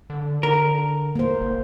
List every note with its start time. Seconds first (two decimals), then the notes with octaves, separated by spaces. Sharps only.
0.10 D3
0.43 D3 A#4
1.16 A#3 C5
1.41 F#1